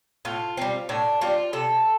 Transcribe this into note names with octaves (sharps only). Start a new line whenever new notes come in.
A2 F4
G3 C4
A2 D4
G3 C4 F4
C3 A4